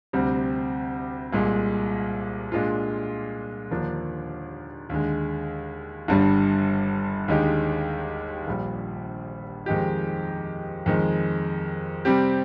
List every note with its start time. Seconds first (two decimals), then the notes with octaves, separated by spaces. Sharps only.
0.13 D2 C3 G3 C4
1.32 C2 A#2 G#3
2.52 A#2 G#3 D4 F4
3.71 D#2 D3 F3 A#3 D4
4.89 D#2 D3 G#3
6.08 G1 G2 D3 G3
7.28 D#2 D3 G#3 D#4 G4
8.47 A#1 A#2 G3
9.66 F2 D#3 G#3 D#4 G4
10.86 F2 D#3 G#3
12.05 C3 G3 C4 G4